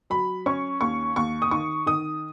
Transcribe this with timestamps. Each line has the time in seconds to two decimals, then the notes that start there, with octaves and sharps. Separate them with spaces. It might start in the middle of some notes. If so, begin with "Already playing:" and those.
0.10 F#3 B5
0.46 C#4 C#6
0.81 D#2 C#6
1.16 D#2 C#6
1.42 D#6
1.51 D#3 C#6
1.86 D#3 D#6